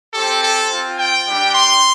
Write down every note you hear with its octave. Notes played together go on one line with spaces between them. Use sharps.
C4 G4 A4
A4
C4 F4
G5
G3 D4 G4
C6